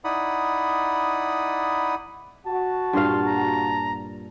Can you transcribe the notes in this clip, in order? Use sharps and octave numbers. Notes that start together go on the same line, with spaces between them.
D#4 E4 D5 F#5 B5 D#6
F#4 A5
G2 A#2 F5 C6
A#5